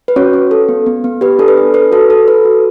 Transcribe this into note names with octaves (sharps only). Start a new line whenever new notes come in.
B4
C#4 F#4 C#5
C#4
A4
B3
B3
B3
G4 B4
D4 A4
B4
D4
A4 B4
F#4 A4
A4
A4 B4
F#4